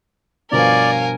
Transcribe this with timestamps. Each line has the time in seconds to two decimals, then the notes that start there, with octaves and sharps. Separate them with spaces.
0.51 G2 B2 F3 A#4 C#5 D5 F5 G#5